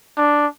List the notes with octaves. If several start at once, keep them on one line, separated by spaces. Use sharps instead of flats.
D4